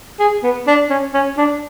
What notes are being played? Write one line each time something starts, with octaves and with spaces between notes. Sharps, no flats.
G#4
B3
D4
C#4
C#4
D4